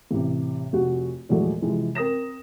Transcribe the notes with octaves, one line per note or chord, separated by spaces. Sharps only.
A1 C3
F1 F#4
E2 A#2 F3 F#3 G#3 A3
C3 E3 F3 G#3 C4
C4 A#4 D#6 A#6 E7